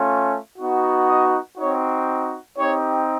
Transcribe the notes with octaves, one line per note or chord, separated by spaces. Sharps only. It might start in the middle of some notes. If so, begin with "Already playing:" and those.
Already playing: A3 C#4 F4
B3 D#4 F#4
D#5
C4 D#4 F#4 C#5
C4 D#4 G4 C#5